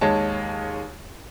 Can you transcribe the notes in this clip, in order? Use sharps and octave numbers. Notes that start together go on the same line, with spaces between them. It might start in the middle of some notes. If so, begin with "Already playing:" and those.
D#2 G#3 C#5 A5